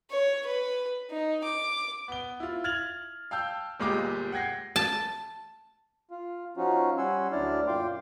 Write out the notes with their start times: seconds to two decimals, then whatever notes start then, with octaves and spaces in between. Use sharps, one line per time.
0.10 C#5
0.47 B4
1.10 D#4
1.44 D6
2.08 B3 G7
2.40 E4 F4
2.64 F6 G#6 A6 F7 F#7
3.31 F5 G5 A5 E6 G6
3.80 G1 A#2 G#3 F4 G4 D6
4.32 F#5 G5 G#6 A#6 C7
4.76 A5
6.11 F4
6.57 F3 C#4 D#4 F4 F#4
6.98 G3 C#4 F#5 G#5 C6 E6
7.32 D2 F#3 D4 E4 D5 F6
7.68 F#2 A#2 F4 G5 C6 D6